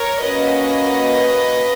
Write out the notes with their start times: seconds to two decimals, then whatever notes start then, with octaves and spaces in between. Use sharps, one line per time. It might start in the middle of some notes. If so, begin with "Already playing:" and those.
Already playing: A#4 C#5
0.23 A#3 C#4 F#4 B4 D#5